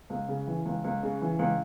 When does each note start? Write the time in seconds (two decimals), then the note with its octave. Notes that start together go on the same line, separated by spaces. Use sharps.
0.10 C#2
0.28 C#3
0.47 E3
0.65 C#2
0.84 C#2
1.03 C#3
1.22 E3
1.39 C#2